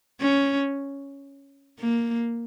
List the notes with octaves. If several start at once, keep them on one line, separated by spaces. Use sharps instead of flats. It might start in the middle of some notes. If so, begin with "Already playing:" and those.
C#4
A#3